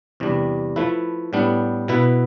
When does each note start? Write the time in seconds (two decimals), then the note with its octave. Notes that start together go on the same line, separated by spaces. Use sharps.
0.20 E2 C3 G3 D4
0.76 F3 A3 E4 B4
1.33 A2 G3 B3 D4
1.88 B2 B3 E4 B4 E5